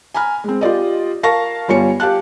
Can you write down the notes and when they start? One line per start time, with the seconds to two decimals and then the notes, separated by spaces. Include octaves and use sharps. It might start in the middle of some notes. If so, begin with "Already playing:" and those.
0.14 G#5 A#5 B5 F6
0.44 G#3 C4
0.61 F4 G4 D5 D#5
1.23 A#4 F5 A5 C#6 A#6
1.68 G1 G3 F4 C#5 G#5 C#7
2.00 G4 F5 A5 F#6